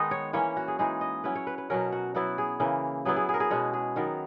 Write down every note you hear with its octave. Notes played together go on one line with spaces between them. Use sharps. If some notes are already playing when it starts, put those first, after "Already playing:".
Already playing: D#3 G#3 B3 D#4 D#5
C#5
E3 A#3 C#4 C#5
F#4
G#4
E3 G#3 D#4 G#4
D#5
F#3 C#4 E4 B4
C#5
B4
B4
B2 F#3 C#4 A#4
F#4
F#3 B3 E4 F#4
G#4
C#3 E3 A#3
F#3 B3 E4 G#4
G#4
G#4
A#4
G#4
B2 G#3 C#4 F#4
G#4
D#3 F#3 B3 A#4